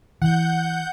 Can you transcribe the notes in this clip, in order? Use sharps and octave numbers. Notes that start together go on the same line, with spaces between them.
E3 F#5 G6